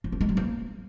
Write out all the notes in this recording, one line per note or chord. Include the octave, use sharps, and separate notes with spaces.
F3
C#4
G#3
F#3
A#3